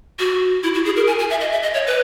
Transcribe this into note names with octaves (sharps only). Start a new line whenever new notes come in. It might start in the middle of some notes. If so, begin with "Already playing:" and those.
F#4
E4
F#4
G#4
A#4
G#5
G#5
E5
D#5
E5
D#5
C#5
B4